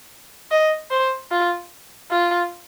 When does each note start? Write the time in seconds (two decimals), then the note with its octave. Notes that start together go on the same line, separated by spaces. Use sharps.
0.51 D#5
0.91 C5
1.31 F4
2.11 F4